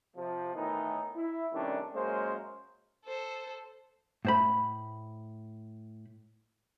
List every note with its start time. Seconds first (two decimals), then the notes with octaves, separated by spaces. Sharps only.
0.16 C3 F3
0.55 A2 D#3 E3 B3 D#4
1.15 E4
1.53 C3 D#3 G3 A3 C#4 D4
1.94 F#2 G#3 A#3 C#4 C5
3.05 A4 C5
4.25 A2 C5 B5